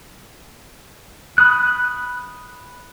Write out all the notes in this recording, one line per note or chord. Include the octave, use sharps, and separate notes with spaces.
B5 D#6 F#6